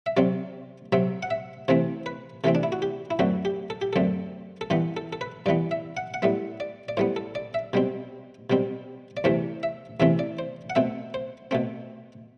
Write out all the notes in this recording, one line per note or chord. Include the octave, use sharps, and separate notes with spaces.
E5
C3 F#3 C4 D5
C3 F#3 C4 E5
F#5
E5
C3 E3 A3 C4 C5
B4
C3 E3 A3 C4 A4
D4
E4
F#4
G4
E4
F#2 D3 A3 C4 F#4
G4
A4
G4
F#2 D3 A3 C4 A4
A4
G2 E3 B3 G4
A4
A4
B4
G2 E3 B3 D5
E5
F#5
F#5
A2 G3 B3 E5
D5
D5
A2 G3 B3 C5
A4
D5
E5
B2 G3 C4
B2 G3 C4
D5
E2 C3 E3 A3 C4 C5
E5
E2 C3 E3 A3 C4 E5
D5
C5
F#5
B2 A3 C4 E5
C5
B2 A3 C4